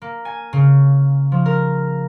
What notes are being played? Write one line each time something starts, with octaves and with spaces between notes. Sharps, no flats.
A#3
G#5
C#3
F3
A#4